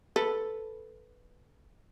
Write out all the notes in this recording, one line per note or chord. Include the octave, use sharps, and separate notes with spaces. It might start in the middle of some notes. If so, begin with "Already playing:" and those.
A4 B4